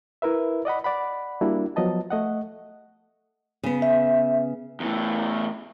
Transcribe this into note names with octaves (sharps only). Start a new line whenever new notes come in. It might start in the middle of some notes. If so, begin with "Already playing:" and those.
E4 A#4 B4 E5
D5 D#5 F#5 B5
D5 F#5 B5
G3 A#3 D4 E4 F#4
F3 F#3 B3 D#5 A5
A3 D#5 F#5
C#3 B3
E5
E2 A2